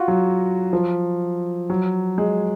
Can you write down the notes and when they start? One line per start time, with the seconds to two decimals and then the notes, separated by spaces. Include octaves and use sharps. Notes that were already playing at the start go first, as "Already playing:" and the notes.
Already playing: F4 F#4
0.08 F#3
0.73 F3
1.70 F#3
2.18 G#3